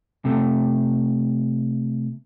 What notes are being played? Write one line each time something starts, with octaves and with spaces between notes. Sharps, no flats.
C3 A3